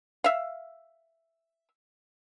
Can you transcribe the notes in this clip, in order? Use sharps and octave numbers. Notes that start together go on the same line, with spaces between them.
E5 F5